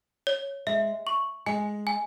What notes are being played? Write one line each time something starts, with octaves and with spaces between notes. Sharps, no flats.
C#5
G#3 E5
C#6
G#3 G#5
G#5